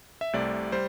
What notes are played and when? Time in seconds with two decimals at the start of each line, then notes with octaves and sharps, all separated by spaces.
0.21 E5
0.33 C2 C3 A3 D5
0.72 G3 C5